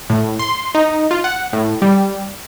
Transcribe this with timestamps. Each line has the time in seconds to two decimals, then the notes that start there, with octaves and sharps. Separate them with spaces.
0.10 A2
0.39 C6
0.75 D#4
1.11 F4
1.24 F#5
1.53 A2
1.82 G3